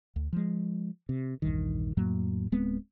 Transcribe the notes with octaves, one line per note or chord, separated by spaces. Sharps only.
D2
F3 G#3
C3
A#1 E2 G2 D#3
F2 A2 F#3 A#3
D1 G#3 B3 C4